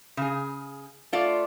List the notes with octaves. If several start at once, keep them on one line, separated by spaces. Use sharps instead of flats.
C#3 G#4
A3 F4 D5